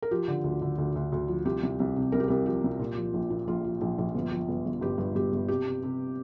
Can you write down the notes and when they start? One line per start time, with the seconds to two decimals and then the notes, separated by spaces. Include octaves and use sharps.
0.02 A#4
0.11 F3 G4
0.28 D3
0.44 D2
0.62 D3
0.78 D2
0.96 D2
1.12 D2
1.28 F3
1.45 C2 G4
1.63 C2
1.80 C2
1.96 C3
2.12 C2 A#4
2.20 G4
2.28 C2 A#4
2.46 F3 G4
2.64 C2
2.79 A#2
2.97 F3
3.14 A#1
3.30 A#2
3.48 A#1 F4
3.64 F3
3.81 A#1
3.98 A#1
4.15 G1
4.32 F3
4.49 G1
4.66 G1
4.81 G1 G4
4.98 G2
5.15 G1 G4
5.32 G1
5.49 C3 G4
5.65 C3
5.83 C3